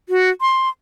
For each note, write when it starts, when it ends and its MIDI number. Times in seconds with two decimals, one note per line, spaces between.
0.09 0.30 66
0.41 0.69 84